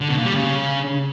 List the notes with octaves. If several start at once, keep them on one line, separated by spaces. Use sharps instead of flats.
D3
B2
A#2
G3
C#3